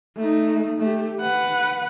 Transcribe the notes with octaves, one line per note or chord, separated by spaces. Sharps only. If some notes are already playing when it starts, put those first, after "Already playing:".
A3 D#4
A3 G4
B4 F#5